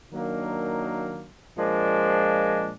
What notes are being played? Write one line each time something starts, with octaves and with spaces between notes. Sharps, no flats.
D#3 F#3 A#3 D4
A#2 F3 G#3 D4